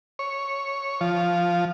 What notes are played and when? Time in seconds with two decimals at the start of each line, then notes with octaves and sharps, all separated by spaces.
0.19 C#5
1.01 F3